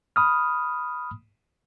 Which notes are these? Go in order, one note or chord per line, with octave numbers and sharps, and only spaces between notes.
B5 D#6 F6